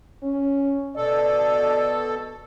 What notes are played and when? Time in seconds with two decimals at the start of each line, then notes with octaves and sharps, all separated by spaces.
0.23 C#4
0.96 B2 A4 D5